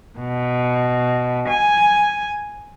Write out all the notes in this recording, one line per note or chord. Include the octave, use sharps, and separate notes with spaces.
B2
G#5